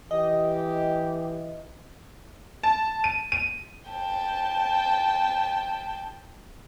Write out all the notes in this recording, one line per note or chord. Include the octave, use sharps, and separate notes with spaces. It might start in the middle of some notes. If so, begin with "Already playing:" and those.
E3 G4 D#5
A5
D#7
D#7
G5 A5